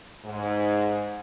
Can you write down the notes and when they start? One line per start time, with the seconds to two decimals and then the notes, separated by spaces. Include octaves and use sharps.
0.25 G#2